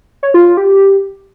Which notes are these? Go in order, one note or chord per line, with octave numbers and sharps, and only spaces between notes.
C#5
F4
F4
G4